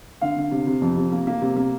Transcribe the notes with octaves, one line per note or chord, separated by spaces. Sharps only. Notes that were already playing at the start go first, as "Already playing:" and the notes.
D3 F5
D3
C3
C3
F2
C3
A#3
A#3
C3
A#3